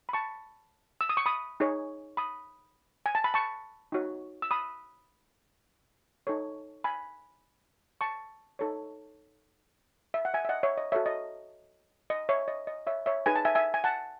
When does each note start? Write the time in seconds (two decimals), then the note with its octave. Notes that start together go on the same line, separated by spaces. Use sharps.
0.09 B5
0.13 A5 C#6
1.01 E6
1.09 D#6
1.17 C#6
1.26 B5 D#6
1.60 D#4 G#4 C#5
2.17 B5 D#6
3.06 G#5
3.15 A5
3.24 B5
3.34 A5 C#6
3.92 D#4 F#4 C#5
4.42 E6
4.51 B5 D#6
6.27 D#4 A4 C#5
6.84 G#5 B5
8.01 A5 C#6
8.59 D#4 A4 C#5
10.14 E5
10.25 F#5
10.34 E5 G#5
10.45 E5
10.49 D#5 F#5
10.63 C#5 E5
10.78 D#5
10.92 F#4 A4 C#5 E5
11.06 D#5
12.10 D#5
12.29 C#5 E5
12.48 D#5
12.67 D#5
12.87 C#5 E5
13.06 C#5 E5
13.26 D#4 G#4 B4 G#5
13.36 A5
13.45 E5 G#5
13.55 E5 G#5
13.74 G#5
13.84 F#5 A5